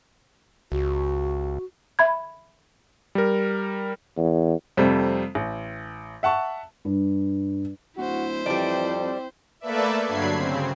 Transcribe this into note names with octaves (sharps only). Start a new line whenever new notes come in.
C#2 F#4
E5 B5 G#6
G3 A#4
E2
F2 C3 G3 A3
A1
E5 F#5 A5 C#6
G2
D1 E4 F#4 C5
F2 E3 G3 D5
C4
A3 A#3 A4 B4 D5 E5
G2 D3 F#3 B5 G#6 C7
C#3 C4